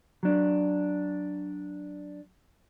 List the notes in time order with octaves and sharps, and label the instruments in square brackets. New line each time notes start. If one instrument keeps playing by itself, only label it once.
[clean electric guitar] F#3 D4